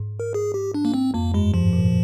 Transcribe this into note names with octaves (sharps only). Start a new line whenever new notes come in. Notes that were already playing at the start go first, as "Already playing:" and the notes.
Already playing: G#2
A#4
G#4
G4
D4
A#3
C4
F2 A#3
G2 G#3
G#2 F3
A#2